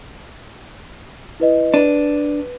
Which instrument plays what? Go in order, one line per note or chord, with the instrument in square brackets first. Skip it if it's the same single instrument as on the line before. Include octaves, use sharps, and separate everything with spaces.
[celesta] E4 B4 D#5
[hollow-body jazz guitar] D4 [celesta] B4 D#7